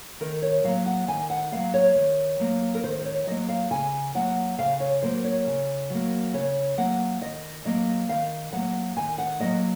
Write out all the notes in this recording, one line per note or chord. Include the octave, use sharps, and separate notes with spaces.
D#3 A#4
C#5
F#3 A#3 F5
F#5
D#3 G#5
F#5
F#3 A#3 F5
C#5
D#3
F#3 A#3
A#4
D#3 C5
C5
C#5
F#3 A#3 D#5
F5
C#3 G#5
F#3 A#3 F#5
C#3 F5
C#5
F#3 A#3 C5
C#5
C#3
F#3 A#3
C#3 C#5
F#3 A#3 F#5
D#3 D#5
F#3 A#3 D#5
D#3 F5
F#3 A#3 F#5
D#3 G#5
F#5
F#3 A#3 D#5